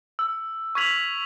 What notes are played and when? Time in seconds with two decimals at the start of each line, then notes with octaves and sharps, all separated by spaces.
0.19 E6
0.75 C#6 F6 G#6 B6 F7 F#7